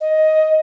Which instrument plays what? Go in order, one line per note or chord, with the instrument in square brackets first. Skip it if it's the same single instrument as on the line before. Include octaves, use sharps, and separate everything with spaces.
[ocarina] D#5